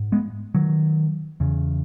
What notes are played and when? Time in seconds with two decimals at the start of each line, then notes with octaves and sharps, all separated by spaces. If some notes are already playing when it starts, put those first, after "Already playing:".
Already playing: G#2
0.12 G#3 B3
0.55 D#3 F#3
1.40 E2 C#3